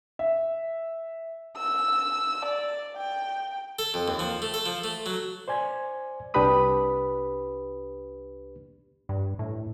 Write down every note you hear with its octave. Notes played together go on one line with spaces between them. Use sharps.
E5
E6
D5
G5
A4
F2
D#2
F3
A3
A4
F3
A3
F#3
C5 D5 G#5 G#6
C2 D4 G4 B4 B5 D#6
G2
A2